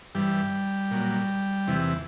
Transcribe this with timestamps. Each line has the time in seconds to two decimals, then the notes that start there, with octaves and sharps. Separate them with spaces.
0.15 G2 E3 G3 G4
0.91 A#2 F#3
1.67 E2 C3 E3